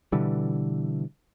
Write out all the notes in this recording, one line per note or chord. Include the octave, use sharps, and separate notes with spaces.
B2 D3 E3 G3